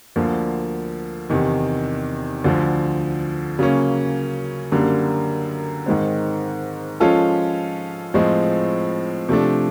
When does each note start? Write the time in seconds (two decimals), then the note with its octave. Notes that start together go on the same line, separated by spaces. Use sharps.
0.16 D2 D3 F3 A#3
1.30 E2 C3 D#3
2.44 D2 D3 F3
3.59 C#3 F#3 A#3 C#4
4.72 F#2 D3 G3 A#3
5.86 G#2 D#3 G#3 C4
7.00 F3 G#3 C#4 F4 A4
8.14 A2 F3 G#3 C4
9.29 C3 F3 A3 D4